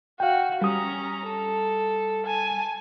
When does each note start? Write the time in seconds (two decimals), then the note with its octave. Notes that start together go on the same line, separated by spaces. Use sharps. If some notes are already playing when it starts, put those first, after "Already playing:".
0.20 F#4 F5 G5
0.62 G3 C#4 A#5 D#6
1.26 A4
2.25 G#5 A5